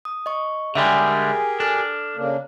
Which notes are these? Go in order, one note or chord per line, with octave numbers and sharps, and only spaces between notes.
D#6
D#5 C#6
D3 G3 G#3 G4 G#4 A#4 E5
D4 A4 F6
C#3 A#3 D4